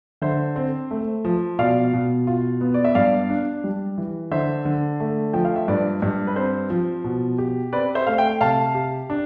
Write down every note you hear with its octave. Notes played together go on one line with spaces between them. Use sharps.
D3 C5 E5
C4
A3
F3
B2 D5 F5
B2
F4
B3
D5
E5
G2 D5 F5
D4
G3
E3
D3 C5 E5
D3
A3
F3 G5
F5
E5
G2 B4 D5
G2
B4
C4 C5
F3
B2
G4
C4 B4 D5
C5 E5
A3 F5
E5 G5
C3 F5 A5
G4
D4